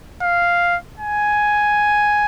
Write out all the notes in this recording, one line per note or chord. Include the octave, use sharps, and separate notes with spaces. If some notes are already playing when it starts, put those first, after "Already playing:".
F5
G#5